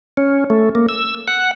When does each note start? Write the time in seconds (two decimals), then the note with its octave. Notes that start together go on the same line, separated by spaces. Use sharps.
0.17 C#4
0.50 A3
0.75 A#3
0.89 E6
1.28 F#5